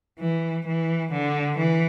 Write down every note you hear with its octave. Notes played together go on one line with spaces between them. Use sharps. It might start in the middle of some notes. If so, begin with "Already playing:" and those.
E3
E3
D3
E3